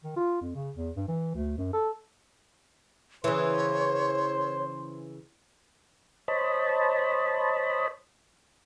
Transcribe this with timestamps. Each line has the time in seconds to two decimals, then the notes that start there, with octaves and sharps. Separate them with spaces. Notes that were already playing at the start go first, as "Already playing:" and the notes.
0.04 D#3
0.17 F4
0.41 F2
0.55 C#3
0.76 E2
0.96 G2
1.08 E3
1.35 D2
1.58 F#2
1.73 A4
3.24 C#3 E3 C5 C#5
6.28 C5 C#5 D#5 A5 B5